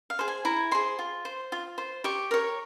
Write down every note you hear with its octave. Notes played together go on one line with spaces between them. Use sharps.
F5
G#4 C5
G#5
E4 A#5
G#4 C5 C6
F4
C5
F4
C5
G4 C#6
A#4 C#5